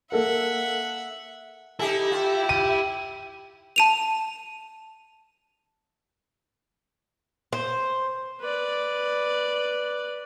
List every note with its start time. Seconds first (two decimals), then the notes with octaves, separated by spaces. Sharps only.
0.12 A#3 A4 A#4 E5 F#5
1.79 D#4 E4 G4 A4
2.12 F4 G4
2.49 D#7
3.76 A5 D#7 F7
7.53 C5
8.41 B4 D5